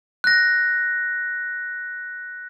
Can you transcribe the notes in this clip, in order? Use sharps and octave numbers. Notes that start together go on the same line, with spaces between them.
F#6 A#6